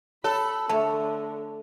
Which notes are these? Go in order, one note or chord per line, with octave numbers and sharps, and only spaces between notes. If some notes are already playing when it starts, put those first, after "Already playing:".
A4 C#5 B5
D3 A3 C#5 A5